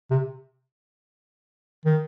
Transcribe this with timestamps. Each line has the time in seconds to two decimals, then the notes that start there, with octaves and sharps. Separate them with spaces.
0.11 C3
1.86 D#3